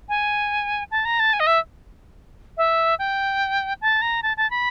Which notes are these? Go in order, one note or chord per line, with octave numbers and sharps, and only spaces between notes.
G#5
A5
A#5
A5
G#5
D#5
E5
E5
G5
A5
A#5
A5
A5
B5